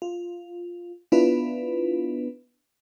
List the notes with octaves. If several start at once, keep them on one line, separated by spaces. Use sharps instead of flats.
F4
B3 D4 E4 F4 B4